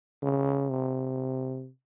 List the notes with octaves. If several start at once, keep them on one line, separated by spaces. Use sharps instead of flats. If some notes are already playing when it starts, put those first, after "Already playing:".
C#3
C3